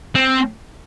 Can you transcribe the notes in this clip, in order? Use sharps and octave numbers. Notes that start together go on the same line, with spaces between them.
C4